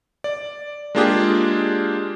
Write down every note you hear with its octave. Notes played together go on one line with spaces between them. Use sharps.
D5
G#3 A#3 D4 F4 G4 G#4